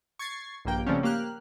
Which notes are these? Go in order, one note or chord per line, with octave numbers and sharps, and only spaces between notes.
C#6 G#6 A6 C7
A#1 G2 A#3 G5
C#3 F3 G3 A3 C4 C#4
A#3 G4 F6 F#6